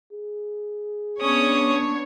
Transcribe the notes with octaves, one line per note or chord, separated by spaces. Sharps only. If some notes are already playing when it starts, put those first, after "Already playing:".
G#4
B3 C#4 D4 C#5 D#6